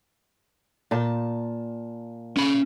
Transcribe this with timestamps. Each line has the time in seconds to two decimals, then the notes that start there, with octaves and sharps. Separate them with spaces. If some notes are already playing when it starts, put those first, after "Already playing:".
0.91 A#2 A5
2.37 C#4 B5